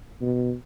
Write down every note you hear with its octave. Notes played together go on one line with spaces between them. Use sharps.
B2